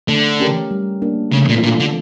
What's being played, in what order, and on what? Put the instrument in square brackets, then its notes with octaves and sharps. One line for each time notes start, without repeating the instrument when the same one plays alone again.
[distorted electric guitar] D3 [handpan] A3
[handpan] C#4 G4 A#4
G3
A#3 D4
[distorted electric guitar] C#3 [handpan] A3
[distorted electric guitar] A#2
[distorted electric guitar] A#2 [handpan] D4 F4 A4
[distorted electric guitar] D3